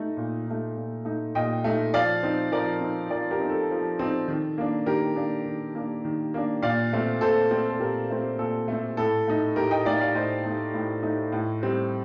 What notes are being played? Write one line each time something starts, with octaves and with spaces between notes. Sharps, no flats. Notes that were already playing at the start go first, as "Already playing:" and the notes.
Already playing: A3 D#4
A#2
A3 D#4
A#2
A3 D#4
A#2 D#5 G5
A3 D#4
F3 D5 F5
C4 D#4
F3 A#4 D5
C4 D#4
F3 A#4 D5
G4 A#4
C4 D#4
A4
F3
C4 D#4
D#3
A#3 D4
D#3 G4 A#4
A#3 D4
D#3
A#3 D4
D#3
A#3 D4
A#2 D5 F5
A3 C4
A#2 A4 C5
A3 C4
A4
A#2 G4 A#4
A3 C4
A#2 A4
A3 C4
A2 A4
A3 D#4
A2 G4 A#4
D#5 G5
A3 D#4 D5 F5
D5 F5
A2 C5 D#5
A3 D#4
A2
A3 D#4
A2
G3 C4